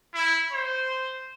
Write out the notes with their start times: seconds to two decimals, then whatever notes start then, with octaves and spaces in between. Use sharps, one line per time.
0.14 E4
0.52 C5